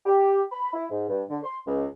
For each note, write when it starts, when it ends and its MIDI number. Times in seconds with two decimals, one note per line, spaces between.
0.06 0.42 67
0.51 0.72 83
0.74 0.85 64
0.90 1.08 44
1.08 1.23 43
1.29 1.38 50
1.43 1.58 84
1.67 1.85 37